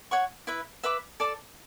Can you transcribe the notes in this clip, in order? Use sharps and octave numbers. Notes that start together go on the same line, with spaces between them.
C#5 F#5 C#6
E4 B4 E5
B4 E5 B5 D6
A4 D5 A5 D6